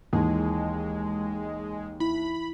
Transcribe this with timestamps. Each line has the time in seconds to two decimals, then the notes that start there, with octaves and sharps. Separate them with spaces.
0.13 D#2 E3 G#3
2.00 E4 B5